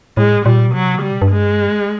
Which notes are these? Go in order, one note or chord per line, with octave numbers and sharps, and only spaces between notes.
A2 G#3
A#2 G3
B2
C3 F#3
D3
C#3 G3
B2
G2
G#3